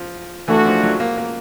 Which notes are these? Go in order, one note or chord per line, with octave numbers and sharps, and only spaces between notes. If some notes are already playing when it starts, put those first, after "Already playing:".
Already playing: F3
E3 A3 D4 F#4
F3
F#3
A#3
A#3